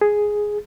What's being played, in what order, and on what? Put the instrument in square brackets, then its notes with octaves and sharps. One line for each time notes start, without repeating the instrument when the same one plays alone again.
[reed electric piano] G#4